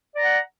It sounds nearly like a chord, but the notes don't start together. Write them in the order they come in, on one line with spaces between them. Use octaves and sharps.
D5 A#5 F#5